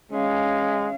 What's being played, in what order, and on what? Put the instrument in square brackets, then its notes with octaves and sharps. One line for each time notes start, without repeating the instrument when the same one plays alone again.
[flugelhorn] G#3 [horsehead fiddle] C#4 F5